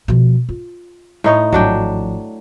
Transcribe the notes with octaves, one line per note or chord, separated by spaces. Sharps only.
B2 F3
F4
A2 D#4 C#5
G#1 F3 F#3 D4 G5